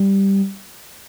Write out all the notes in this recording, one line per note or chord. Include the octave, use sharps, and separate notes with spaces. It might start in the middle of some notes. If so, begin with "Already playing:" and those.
Already playing: G3